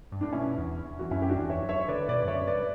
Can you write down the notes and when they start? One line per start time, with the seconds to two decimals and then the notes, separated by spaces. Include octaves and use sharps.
0.12 G2
0.21 A2 D4
0.32 B2 C#4 E4
0.58 E2
0.85 E2
0.99 E2 F#4
1.11 F#2 C#4 E4
1.22 G4
1.30 D4 F#4
1.37 E2
1.50 C#5 E5
1.63 F#2
1.69 C#5 E5
1.81 C#5
1.88 D3 B4 D5
2.08 B2 B4 D5
2.21 G2 D5
2.28 F#2 C#5 E5
2.47 G2 B4 D5